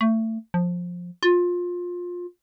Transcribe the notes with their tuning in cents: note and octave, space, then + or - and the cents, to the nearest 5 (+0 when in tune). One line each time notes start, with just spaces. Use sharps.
A3 +25
F3 +15
F4 +20